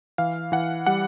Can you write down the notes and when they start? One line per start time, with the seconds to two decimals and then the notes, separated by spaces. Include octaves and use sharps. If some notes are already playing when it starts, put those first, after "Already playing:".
0.18 E3 F5
0.52 E3 F#5
0.86 G3 F#5